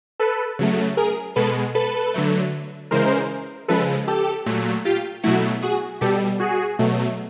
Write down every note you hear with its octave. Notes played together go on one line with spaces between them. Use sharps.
A4 B4
C#3 F#3 A3
G#4 A#4
B2 G#3 A4 B4
A4 B4
D3 F#3 A3
C#3 E3 G#3 A#4 C5
C#3 F3 G#3 A4 B4
G4 A4
A#2 F#3 A3
F4 G4
B2 F#3 A3 E4 F#4
F#4 G#4
B2 G3 G4 A4
F#4 G#4
B2 F#3 A3